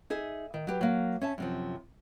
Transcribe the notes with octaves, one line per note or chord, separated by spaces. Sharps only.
D#4 G#4 E5
D#3
F#3 G4 B4
F#3 A#3
C#4 E5 A5
F#2 C3 F3